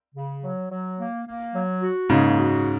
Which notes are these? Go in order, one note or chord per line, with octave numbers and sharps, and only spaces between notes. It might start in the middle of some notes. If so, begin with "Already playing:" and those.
C#3
F#3
F#3
A#3
A#3
F#3
F#4
G#2 C#3 A#3
F#4